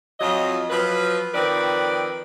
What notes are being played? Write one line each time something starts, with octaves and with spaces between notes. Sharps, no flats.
F2 F#3 F4 D#5
F3 F#3 B4
D#3 F3 C4 B4 D5